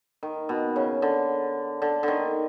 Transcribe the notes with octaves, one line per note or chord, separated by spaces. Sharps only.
D#3
B2
C#3
D3
D3
D3 D#3